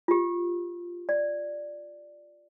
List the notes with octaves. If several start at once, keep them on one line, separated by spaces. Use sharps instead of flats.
F4 G4
D5